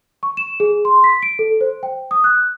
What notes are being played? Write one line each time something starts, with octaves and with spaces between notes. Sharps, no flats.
C#6
E7
G#4
C6
B6
D7
A4
C5
G5
D#6
F#6